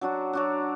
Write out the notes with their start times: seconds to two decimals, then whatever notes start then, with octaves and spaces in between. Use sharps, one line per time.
0.01 F#3 D4 F#4
0.33 F#3 D4 F#4